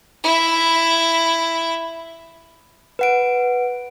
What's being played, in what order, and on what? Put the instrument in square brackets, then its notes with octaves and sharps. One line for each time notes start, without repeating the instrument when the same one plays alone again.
[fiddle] E4 E5
[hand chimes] B4 F#5 D7